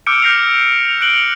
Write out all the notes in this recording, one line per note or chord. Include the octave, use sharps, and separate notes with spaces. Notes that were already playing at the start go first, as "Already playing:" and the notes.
D6 E6 F6 G6 C#7 D7
F6 G6 A#6 C7 F7
F7
F#6 C#7 D7 F#7 G7